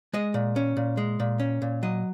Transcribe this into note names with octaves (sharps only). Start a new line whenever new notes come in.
G#3 D#5
A#2
C#4
A#2
G#3
A#2
C#4
A#2
F#3 D#5